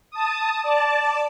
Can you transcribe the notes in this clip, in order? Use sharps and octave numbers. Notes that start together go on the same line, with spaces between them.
A5 D#6
D5 A5